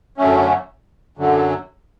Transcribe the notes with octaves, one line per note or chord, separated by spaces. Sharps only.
F#2 D3 F#3 A3 C#4
F#2 D3 F#3